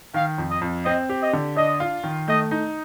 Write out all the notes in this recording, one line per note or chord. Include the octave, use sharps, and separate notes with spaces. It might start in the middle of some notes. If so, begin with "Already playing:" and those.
D#3 F5
F2
D#5
F2
C4 D#5
G4
D#5
D3
D4 D#5
F4
D#3
A3 D#5
D#4